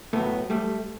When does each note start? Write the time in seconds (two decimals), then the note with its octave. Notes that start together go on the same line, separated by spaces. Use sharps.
0.13 A2 F#3 A3 B3
0.50 G3 A3